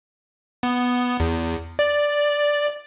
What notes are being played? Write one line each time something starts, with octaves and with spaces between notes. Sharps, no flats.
B3
E2
D5